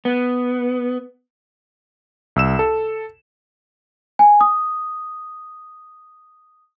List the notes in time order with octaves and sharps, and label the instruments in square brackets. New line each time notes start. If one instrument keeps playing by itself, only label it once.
[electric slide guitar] B3
[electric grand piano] C2 E6 E7
A4
[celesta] G#5
D#6